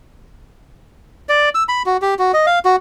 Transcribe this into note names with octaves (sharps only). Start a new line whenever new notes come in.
D5
E6
B5
F#4
G4
F#4
D#5
F5
F#4